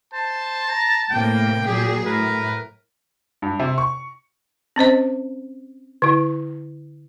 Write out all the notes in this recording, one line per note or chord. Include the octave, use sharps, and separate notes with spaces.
C5 A5
A#5
A2 C3 A#3 G5
A#2 F#3 G4 G#4
A2 A#4 B4
G2
C3
C#6
C4 C#4 C5 D#5
D3 E4